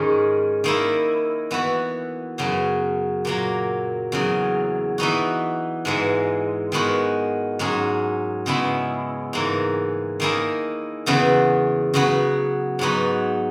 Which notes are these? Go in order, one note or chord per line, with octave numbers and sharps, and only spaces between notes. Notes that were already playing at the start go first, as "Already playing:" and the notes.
Already playing: G#2 D#3 G#3 C#4
D#3 A#3 E4
E3 B3 F#4
F#2 C#3 F#3 B3
A#2 F#3 A#3
E2 C#3 F#3
E3 B3 D#4 F#4
G#2 E3 G#3
D#3 G#3 B3 F#4
G#2 F#3 C#4 G#4
C#3 G#3 B3 E4
G#2 E3 A#3
D#3 A#3 E4 G#4
E2 C#3 E3 B3 F#4
C#3 F#3 B3 F#4
G#2 F#3 B3 D#4 F#4